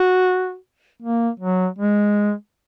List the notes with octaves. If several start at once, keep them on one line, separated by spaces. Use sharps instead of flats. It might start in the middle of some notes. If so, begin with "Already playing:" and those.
Already playing: F#4
A#3
F#3
G#3